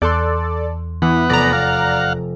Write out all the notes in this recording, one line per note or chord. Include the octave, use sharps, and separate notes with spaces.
E2 A4 D5 C6 F#6 G6
E3 B3 F#5
F1 D5 A#5 A#6
F5 F#5